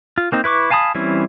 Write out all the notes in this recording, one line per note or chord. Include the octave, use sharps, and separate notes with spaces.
F4
A#3 C4 D#4
E4 B4 C#6 D6
F5 G#5 A5 B5 D#6
E3 G3 C4 C#4 E4